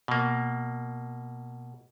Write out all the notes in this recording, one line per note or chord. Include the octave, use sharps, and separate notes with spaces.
B2 A#3